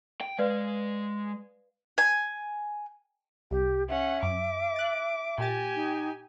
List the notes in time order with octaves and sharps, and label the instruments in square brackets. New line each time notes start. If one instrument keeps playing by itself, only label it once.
[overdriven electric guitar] G5
[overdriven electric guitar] G#3 [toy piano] B4 D5 F5
[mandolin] G#5
[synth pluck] C2 [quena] G4
[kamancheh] C#4 F#5 [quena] E5
[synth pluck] F#2 [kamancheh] D6
[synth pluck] F#6 A6
[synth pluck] A#2 A6 [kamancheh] G4 G#5
[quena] D#4